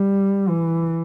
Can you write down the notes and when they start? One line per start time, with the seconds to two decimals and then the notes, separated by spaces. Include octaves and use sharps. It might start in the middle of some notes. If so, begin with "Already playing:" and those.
Already playing: G3
0.49 E3